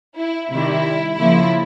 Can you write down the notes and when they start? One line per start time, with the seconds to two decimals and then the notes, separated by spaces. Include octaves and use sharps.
0.17 E4
0.50 C3 D#3 G3 E4
1.17 C#3 F3 A#3 E4